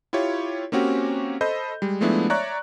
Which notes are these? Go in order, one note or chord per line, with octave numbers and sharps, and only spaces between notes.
E4 F4 G4 C#5
A#3 C4 C#4 F#4 G4
A4 C5 D#5 B5 G6
G3 G#3
F3 G#3 A3 B3 D4 E4
C#5 D5 E5 A#5 C#6 F#6